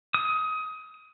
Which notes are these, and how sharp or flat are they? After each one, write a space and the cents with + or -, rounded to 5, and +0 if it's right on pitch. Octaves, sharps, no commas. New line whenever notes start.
D#6 +20